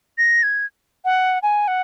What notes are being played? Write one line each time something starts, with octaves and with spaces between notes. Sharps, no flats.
A#6
G#6
F#5
G#5
F#5